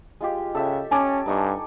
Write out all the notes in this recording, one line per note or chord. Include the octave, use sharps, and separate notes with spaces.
G#3 F4 G4
C#3 A4 E5 G5
C#4 G#5 A5 D6
G2 D#4 D#5 C#6